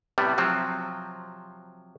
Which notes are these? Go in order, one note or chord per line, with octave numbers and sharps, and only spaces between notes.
A2 C3 G3 B3
C3 F3 F#3 C4